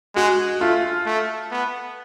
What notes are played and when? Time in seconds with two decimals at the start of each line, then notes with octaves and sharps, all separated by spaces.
0.15 G#3 F#4
0.60 A3 F4
1.06 A3
1.51 B3